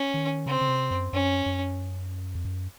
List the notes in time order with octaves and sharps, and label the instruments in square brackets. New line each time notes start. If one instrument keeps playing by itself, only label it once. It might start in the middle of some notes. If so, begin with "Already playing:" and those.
Already playing: [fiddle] C#4
[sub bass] D#3
[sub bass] C#3 [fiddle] C4
[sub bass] C#3
C3
F#2
[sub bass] F#2 [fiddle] C#4
[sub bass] F#2
F2
F#2